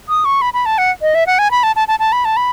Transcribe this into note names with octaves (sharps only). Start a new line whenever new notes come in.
D#6
C#6
B5
B5
A5
F#5
D#5
E5
F#5
G#5
B5
A5
A5
A5
A5
B5
A5
B5